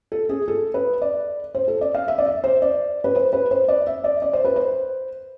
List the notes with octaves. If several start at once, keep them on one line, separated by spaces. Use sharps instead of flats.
A4
G#4
A4
B4
D5
C5
A4
D5
F5
E5
D5
E5
C5
D5
B4
C5
B4
C5
D5
E5
D5
D5
C5
B4
C5